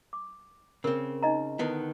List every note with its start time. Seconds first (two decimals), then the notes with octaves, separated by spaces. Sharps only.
0.13 D6
0.84 C#3 C4 A#4
1.23 D#4 D#5 A#5
1.59 D3 D#3 B3 E4